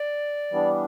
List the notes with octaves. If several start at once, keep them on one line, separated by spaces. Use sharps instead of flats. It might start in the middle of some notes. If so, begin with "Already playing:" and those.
Already playing: D5
E3 G3 B3 D4